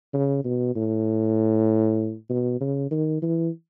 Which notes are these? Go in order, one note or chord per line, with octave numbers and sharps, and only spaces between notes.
C#3
B2
A2
B2
C#3
D#3
E3